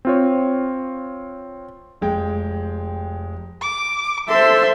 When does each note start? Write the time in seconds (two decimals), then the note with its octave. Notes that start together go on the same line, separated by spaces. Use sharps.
0.05 C4 F4 C#5
2.01 F1 G#3 G5
3.62 D6
4.29 A4 C5 E5 C6